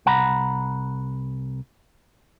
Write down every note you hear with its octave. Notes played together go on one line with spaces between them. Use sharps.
C2 F#5 A#5 B5